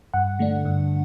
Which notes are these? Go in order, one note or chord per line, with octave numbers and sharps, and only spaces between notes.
G2 F#5
D3 A3 D4
G2